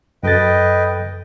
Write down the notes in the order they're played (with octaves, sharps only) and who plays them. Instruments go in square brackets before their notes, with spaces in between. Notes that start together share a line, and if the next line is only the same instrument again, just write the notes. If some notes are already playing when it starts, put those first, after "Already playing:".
[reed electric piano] F#2 A4 A6 [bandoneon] B4 D#5 G5